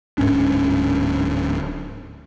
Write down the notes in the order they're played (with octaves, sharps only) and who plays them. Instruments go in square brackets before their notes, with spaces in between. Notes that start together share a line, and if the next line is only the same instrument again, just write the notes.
[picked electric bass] D1 G#2 C#4 D4